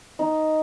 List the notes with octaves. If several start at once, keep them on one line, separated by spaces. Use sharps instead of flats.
D#4